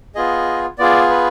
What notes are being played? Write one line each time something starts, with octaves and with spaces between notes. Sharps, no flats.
B3 F4 G#4 D#5
B3 F4 G#4 D5
B4